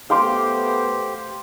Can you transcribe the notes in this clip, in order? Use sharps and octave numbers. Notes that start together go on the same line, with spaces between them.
A3 B3 G4 C5 F5 C6 D6